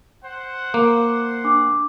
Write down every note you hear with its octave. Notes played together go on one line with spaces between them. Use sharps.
C5 F#5
A#3 D6
D4 D6